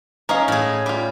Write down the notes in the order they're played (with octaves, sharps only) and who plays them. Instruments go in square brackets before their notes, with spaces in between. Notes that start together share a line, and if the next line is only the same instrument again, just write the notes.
[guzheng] C#4 [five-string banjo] A#4 D#5 F5
[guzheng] A2 G#4
[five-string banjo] G3 F4 [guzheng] G4